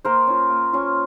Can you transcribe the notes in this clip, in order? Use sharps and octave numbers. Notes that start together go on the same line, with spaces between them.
A#3 A#4 C5
C#4 F4
A#3
C#4 F4